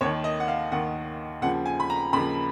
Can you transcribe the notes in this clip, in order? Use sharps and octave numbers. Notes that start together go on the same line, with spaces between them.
D#2 D#3 C#5
D#5
F#5
F5
D#2 D#3 F#5
D#2 C#3 F3 F#5
G#5
B5
A#5
D#2 C#3 F3 B5